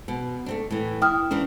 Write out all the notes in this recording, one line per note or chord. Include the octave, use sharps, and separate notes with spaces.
B2
A3 C4 D4
A2 E3
E4 G5 D#6 F6
E3 A#3 C#4 D4